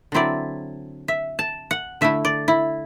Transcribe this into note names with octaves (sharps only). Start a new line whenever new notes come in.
D3 F#3 C4 E4 D5
E5
A5
F#5
D3 A3 E4 E5
D5
E4